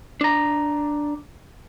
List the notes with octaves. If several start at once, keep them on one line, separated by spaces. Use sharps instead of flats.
D4 A#5